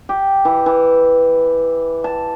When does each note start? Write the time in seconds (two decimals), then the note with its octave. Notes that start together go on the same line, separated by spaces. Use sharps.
0.09 G4
0.45 E3
0.66 E3
2.04 A5